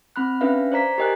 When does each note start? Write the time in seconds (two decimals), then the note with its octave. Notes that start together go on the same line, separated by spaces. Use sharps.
0.16 C4 B5 F#6
0.41 C#4 D4 B4 E5 F5
0.72 C5 D5 A#5 B6
0.98 G4 A#4 D#5 G#5 F#6